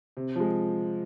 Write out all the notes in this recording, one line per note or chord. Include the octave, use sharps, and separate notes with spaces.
C3
F3 G#3